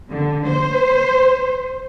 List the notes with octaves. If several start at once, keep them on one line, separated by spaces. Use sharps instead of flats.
D3
C5